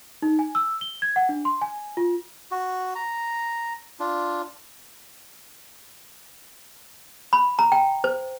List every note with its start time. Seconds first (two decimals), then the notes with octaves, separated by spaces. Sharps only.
0.22 D#4
0.39 G#5
0.55 E6
0.81 G7
1.02 G#6
1.16 F#5
1.29 D4
1.45 C6
1.62 G#5
1.97 F4
2.51 F#4
2.95 A#5
4.00 D4 F4
7.33 B5
7.59 A#5
7.72 G5
8.04 C5